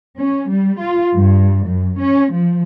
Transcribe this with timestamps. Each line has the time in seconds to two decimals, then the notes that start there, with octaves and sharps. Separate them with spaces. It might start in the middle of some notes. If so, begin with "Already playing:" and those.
0.18 C#4
0.50 G3
0.80 F4
1.15 G2
1.65 F#2
1.99 C#4
2.33 F3